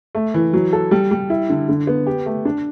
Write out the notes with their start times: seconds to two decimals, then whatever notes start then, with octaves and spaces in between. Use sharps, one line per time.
0.15 A3
0.34 E3
0.53 F#3
0.73 A4
0.91 G3
1.11 G3
1.30 E4
1.50 D3
1.69 D3
1.87 B3
2.07 G4
2.26 A3
2.45 D4